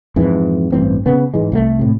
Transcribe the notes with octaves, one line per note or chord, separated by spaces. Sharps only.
F2 G#2 E3
A1 G2 E3 C4
C#3 B3
G#2 E3 G#3
C2 E3 A3
A2 C3